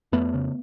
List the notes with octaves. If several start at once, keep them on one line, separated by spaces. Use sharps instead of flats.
F2 A3 B3
C#3